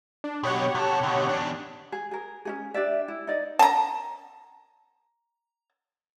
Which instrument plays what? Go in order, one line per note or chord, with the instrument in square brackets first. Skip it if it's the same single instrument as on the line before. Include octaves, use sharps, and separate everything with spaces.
[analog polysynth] D4
[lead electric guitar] B2 F#3 [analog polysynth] G4 C#5 F#5
[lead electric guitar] C3 A4
B2 D3
E2 D4
[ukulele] G#4
G#4 A#4
C#4 D#4 G#4
D4 G4 D5 E5
E4
D#4 D5 D#5
[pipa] A5 A#5